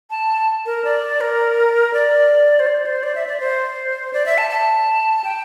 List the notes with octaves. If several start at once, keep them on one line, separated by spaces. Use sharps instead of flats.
A5
A#4
D5
A#4
D5
C5
D5
C5
D5
E5
D5
C5
D5
E5
A5
A5
G5